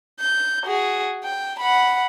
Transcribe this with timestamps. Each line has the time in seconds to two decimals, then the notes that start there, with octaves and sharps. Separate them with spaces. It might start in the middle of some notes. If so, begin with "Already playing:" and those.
0.20 G6
0.64 F#4 G#4
1.24 G5
1.60 F#5 B5